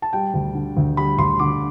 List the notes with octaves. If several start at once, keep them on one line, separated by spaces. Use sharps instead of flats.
A5
G3 G5
D2
D3
D2
G3 B5
D2 C6
D3 D6